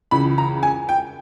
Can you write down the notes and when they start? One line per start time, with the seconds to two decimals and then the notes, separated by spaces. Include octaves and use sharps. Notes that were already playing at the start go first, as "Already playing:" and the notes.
0.11 C#2 C#3 E3 B5
0.38 A#5
0.63 G#5
0.89 G5